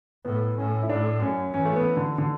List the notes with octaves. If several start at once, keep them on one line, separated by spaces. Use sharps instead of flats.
A2 B3
A2 C#4
E4
A2 D4
F#2 C#4
E3 C#4
A3
B3
D3
D3